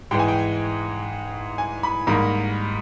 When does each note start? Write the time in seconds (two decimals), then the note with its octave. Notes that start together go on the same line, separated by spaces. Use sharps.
0.11 G#2 E3 G#3 G5
0.19 G#5
0.28 G5
1.58 G#5
1.83 B5
2.07 G#2 D#3 G3 A#3 B5